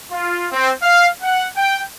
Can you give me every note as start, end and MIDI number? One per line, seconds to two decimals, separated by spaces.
0.11 0.47 65
0.52 0.71 60
0.82 1.07 77
1.22 1.46 78
1.57 1.81 79